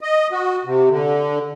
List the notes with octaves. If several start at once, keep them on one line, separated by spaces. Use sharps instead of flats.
D#5
F#4
C3
D3